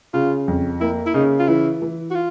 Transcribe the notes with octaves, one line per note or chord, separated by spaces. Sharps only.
C#3 F4
F2
A#3 E4
E4
C#3 D#4
F4
E3 E4
E3
F#4
F4